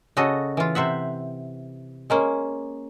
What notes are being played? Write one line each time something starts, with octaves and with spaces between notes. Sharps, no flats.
C#3 F#4 A4 D#5
E3 F4
C3 C5 E5 F#5
G#3 A#3 C#4